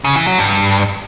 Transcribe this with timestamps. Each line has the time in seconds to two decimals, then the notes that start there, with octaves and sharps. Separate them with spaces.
0.04 C#3
0.16 E3
0.27 F#3
0.38 G2